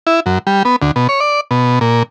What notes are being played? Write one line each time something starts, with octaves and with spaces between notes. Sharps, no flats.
E4
F#2
G3
B3
D2
B2
C#5
D5
B2
A#2